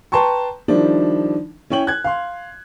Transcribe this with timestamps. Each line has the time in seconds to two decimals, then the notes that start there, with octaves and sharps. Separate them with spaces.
0.12 B4 G5 A5 A#5 C6 C#6
0.68 D#3 F3 G3 D4 E4
1.70 C#4 E4 C#5 G5 F#7
1.87 F#6 G#6
2.04 F5 C6